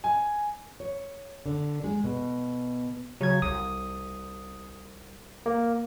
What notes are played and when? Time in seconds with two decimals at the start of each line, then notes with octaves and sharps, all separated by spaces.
0.04 G#5
0.80 C#5
1.46 D3
1.84 G#3
2.04 B2
3.21 C#3 F#3 G#6
3.42 C2 D#6
5.46 A#3